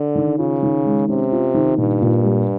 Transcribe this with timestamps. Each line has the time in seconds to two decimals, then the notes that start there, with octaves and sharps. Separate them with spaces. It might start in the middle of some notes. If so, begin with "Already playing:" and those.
Already playing: D3
0.15 D#3
0.38 C#3 F4
0.62 D#3
0.85 G#3
1.09 C3 C#4
1.32 F4
1.54 D#3
1.78 G2 A#2
2.02 A#2
2.24 G3